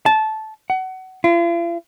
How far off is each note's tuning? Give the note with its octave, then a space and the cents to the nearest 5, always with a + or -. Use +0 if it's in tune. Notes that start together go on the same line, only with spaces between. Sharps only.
A5 -15
F#5 +25
F4 -45